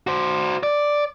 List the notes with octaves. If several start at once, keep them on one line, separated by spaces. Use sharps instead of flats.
F#4 C5
D5